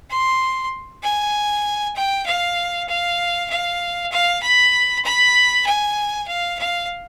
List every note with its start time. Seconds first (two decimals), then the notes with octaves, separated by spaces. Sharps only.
0.10 C6
1.03 G#5
1.96 G5
2.26 F5
2.88 F5
3.50 F5
4.12 F5
4.42 B5
5.05 B5
5.66 G#5
6.28 F5
6.59 F5